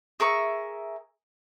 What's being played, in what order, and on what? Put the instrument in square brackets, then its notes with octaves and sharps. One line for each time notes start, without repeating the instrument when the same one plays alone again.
[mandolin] G#4 A#4 E5 C#6